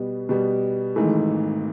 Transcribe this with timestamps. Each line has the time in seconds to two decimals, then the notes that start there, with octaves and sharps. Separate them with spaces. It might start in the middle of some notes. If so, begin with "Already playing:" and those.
Already playing: B2 G3 B3
0.29 B2 G3 B3
0.96 G#1 G#2 E3 A3